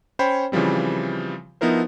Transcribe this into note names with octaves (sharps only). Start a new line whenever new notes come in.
C#4 C5 C#5 G5 B5
C#3 E3 F3 G3 C4
F3 B3 D#4 E4 A#4 C5